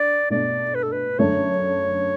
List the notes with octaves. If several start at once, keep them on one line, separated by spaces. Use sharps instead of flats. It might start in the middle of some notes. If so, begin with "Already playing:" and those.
Already playing: D4 D5
B2 A3 D4 D5
B4
A4
B4
F#2 D3 A3 C#5